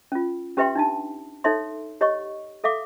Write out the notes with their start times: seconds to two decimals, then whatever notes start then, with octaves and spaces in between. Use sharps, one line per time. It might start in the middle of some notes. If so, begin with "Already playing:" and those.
0.12 C#4 F4
0.57 C#4 G4 B4 E5 G5 C6
0.75 D4 D#4 A5
1.44 D#4 A4 C#5 E5 C6
2.01 G4 C#5 D#5 F#5 C#6
2.64 A4 E5 F5 D6